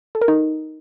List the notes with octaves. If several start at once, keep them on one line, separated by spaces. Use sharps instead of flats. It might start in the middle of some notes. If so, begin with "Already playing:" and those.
A4
A#4
D#4